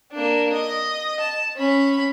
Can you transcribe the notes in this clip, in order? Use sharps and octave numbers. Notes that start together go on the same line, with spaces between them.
A#3 D4
D#5
A5
C#4 B5